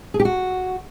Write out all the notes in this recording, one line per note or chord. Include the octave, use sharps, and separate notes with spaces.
G#4
G4
F#4